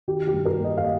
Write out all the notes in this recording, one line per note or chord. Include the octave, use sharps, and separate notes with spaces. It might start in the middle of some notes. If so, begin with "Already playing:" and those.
D#3 G4
G4
G2
A#4
A#3
D#5
F5
D#5